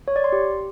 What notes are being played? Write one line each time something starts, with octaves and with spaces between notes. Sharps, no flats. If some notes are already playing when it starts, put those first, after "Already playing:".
C#5
D5
C6
G4